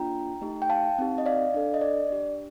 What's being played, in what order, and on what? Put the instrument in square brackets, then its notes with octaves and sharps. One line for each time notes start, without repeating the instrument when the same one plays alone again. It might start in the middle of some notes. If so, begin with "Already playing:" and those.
Already playing: [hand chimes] A#3 D4 F4 G5 A#5
A3 D#4 G4
G5
F5 A5
C4 D#4 G4
D#5
D5 F5
D4 A4
D#5
D5
D4 G4